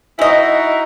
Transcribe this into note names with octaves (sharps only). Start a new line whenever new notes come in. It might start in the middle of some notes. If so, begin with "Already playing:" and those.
G#3 D#4 E4 F#4 D#5